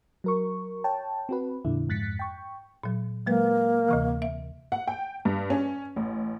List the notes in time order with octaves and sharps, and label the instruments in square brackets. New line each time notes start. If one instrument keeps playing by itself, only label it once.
[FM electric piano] F#3 A#4 C#6
C#5 G5 A5
C4 F#4 B4
F2 A#2 D3 E4
F2 G#2 F#6 A6 B6 C#7
G5 C#6
[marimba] A#2 F#3
[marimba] F#3 G#3 B4 [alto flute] A#3
[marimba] D2 C3 E3
E5
[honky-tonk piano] F#5
G5
G2
C#4
A1